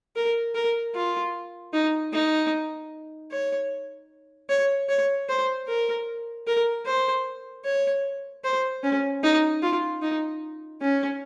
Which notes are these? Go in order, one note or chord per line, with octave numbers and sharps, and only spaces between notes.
A#4
A#4
F4
D#4
D#4
C#5
C#5
C#5
C5
A#4
A#4
C5
C#5
C5
C#4
D#4
F4
D#4
C#4